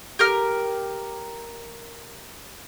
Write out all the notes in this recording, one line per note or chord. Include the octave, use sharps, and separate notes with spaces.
G4 A#4 F6